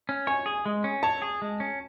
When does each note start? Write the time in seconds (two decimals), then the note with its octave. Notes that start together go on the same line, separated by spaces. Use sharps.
0.09 C#4
0.27 C#5 G#5
0.46 G#4
0.66 G#3
0.84 C#4
1.03 C#5 A5
1.22 G#4
1.42 G#3
1.60 C#4